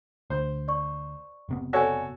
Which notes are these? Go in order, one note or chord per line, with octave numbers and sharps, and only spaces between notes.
D2 C5
D5 C#6
F#1 C3 B3
F#4 A4 C#5 D5 G#5